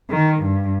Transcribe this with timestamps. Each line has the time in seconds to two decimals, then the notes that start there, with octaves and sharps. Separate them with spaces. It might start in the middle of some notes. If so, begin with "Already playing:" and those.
0.10 D#3
0.42 G2